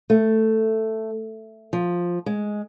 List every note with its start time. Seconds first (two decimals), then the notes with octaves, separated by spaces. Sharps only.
0.10 A3
1.73 F3
2.26 G#3